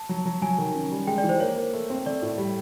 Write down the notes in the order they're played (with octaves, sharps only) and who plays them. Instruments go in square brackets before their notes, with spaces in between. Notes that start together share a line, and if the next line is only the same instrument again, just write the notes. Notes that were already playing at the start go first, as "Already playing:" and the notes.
Already playing: [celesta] A5
[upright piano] F#3
F#3
[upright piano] F#3 [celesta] G#5
[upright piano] D#3
C#4
G3
[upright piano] G#3 [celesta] G5
[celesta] D5
[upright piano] E3
[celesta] C5
[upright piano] A#3 [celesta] C#5
[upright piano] A#3
A3
C4
[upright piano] A3 [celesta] D5
[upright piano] A2
G3